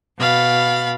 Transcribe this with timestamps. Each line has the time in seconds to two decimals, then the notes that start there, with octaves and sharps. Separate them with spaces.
0.18 B2 F5 B5 A6